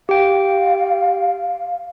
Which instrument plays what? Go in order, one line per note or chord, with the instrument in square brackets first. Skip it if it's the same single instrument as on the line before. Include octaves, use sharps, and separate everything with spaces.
[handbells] G4 G5 [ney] F5